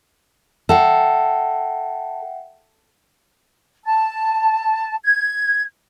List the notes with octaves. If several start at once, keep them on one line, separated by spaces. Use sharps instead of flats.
A4 E5 F#5 G5
A5
G#6